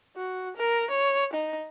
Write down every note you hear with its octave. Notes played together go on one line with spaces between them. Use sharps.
F#4
A#4
C#5
D#4